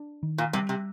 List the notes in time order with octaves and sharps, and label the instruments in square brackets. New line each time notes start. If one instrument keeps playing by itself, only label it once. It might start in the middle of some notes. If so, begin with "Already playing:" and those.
Already playing: [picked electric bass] D4
D#3
[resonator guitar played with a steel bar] A#2
[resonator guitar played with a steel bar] C3 [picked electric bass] G3
[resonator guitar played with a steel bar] C3